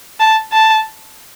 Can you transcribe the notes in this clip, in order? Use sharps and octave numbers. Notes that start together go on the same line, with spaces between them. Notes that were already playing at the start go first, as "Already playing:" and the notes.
A5
A5